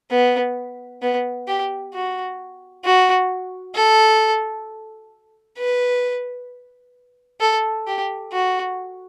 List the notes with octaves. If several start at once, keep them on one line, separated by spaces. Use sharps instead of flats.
B3
B3
G4
F#4
F#4
A4
B4
A4
G4
F#4